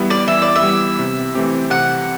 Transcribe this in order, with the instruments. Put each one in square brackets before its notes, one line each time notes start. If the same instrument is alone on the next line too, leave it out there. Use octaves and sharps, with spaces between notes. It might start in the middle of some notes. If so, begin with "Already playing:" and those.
Already playing: [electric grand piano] E3 G3 B3 E4
[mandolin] D5
[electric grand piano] E3 [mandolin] E5
[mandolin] D5
E5
[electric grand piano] G3 B3 E4
C3
E3 A3 C4 G4
[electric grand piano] C3 [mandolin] F#5